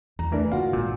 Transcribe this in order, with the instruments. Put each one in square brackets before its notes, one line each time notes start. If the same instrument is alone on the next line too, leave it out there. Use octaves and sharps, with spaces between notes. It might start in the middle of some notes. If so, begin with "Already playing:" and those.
[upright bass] E2 [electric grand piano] A#5
[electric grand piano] E3 A#4 [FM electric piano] A3 D4
[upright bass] D3 [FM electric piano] A#3 F#4 [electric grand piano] F4 F5
[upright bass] G#1 [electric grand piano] A#2